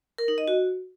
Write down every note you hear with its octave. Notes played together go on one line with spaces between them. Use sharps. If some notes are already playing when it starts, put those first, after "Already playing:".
A#4
D#4
D#5
F#4